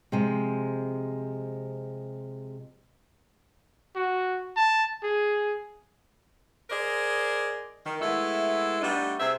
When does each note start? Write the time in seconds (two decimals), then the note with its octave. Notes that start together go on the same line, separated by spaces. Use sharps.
0.12 C3 F3 G#3
3.96 F#4
4.57 A5
5.03 G#4
6.70 G#4 A#4 C5 D5 D#5
7.85 D#3
8.01 G#3 A3 B3 E4 A4
8.81 G3 A3 B3 D4 D#4
9.19 C3 C4 G#4 E5